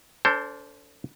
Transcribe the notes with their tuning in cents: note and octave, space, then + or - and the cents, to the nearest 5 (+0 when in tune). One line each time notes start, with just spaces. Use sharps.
D4 -40 A4 +20 C5 +0